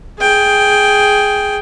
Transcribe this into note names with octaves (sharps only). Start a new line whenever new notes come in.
G#4 G5